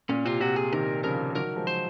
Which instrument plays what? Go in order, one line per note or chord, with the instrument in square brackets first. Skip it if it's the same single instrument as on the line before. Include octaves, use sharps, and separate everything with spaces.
[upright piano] A#2 [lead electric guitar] C#4
[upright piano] C3 [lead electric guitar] F4
[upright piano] C3 [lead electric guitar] F#4
[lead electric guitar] G#4
[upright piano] C3 D#3 [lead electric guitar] A#4
[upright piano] C#3 F3 [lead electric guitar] A#4
[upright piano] D#3 F#3 [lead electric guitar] A#4
[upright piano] F3 G#3
[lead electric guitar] C5